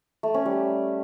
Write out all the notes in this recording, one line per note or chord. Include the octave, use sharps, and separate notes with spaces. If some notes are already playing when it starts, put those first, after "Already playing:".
A3
C#4
G3